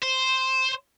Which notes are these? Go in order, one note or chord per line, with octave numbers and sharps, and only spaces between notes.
C5